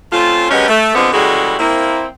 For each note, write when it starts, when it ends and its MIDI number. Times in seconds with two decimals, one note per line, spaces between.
0.12 0.48 57
0.12 0.48 60
0.12 0.48 61
0.12 0.48 65
0.50 0.65 42
0.50 0.65 56
0.50 0.65 59
0.50 0.65 61
0.50 0.65 67
0.50 0.65 75
0.68 0.91 57
0.94 1.09 50
0.94 1.09 53
0.94 1.09 56
0.94 1.09 59
0.94 1.09 60
1.12 1.56 49
1.12 1.56 52
1.12 1.56 55
1.12 1.56 56
1.12 1.56 66
1.12 1.56 69
1.59 2.06 58
1.59 2.06 60
1.59 2.06 64